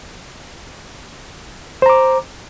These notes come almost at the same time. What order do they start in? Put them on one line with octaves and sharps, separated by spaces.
C5 A#5 D6